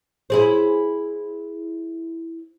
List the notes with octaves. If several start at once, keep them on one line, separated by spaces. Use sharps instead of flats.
E4 G#4 C5